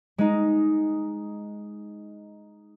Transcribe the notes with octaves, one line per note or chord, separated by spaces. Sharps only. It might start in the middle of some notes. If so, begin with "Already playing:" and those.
G#3 D#4